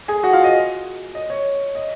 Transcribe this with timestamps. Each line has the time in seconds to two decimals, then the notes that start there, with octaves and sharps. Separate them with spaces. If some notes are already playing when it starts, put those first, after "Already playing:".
0.08 G#4 G#5
0.23 F#4 F#5
0.33 F4 F5
0.44 D#5
1.15 D#5
1.30 C#5
1.75 D#5